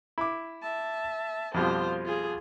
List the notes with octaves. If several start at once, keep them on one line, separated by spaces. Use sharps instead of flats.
E4 D6
E5 A5
F2 B2 G3 F4 C5
F4 G#4